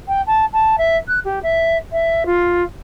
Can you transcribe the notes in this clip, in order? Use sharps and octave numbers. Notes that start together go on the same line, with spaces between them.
G5
A5
A5
E5
F#6
G4
E5
E5
F4